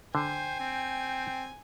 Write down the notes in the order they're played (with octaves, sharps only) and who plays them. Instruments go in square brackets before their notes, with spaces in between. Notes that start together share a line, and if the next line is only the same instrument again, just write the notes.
[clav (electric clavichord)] D3 [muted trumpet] C5 [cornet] G5 [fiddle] G#5
[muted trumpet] C4